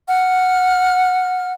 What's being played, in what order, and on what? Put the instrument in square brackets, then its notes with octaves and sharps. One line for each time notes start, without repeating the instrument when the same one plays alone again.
[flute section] F#5 F6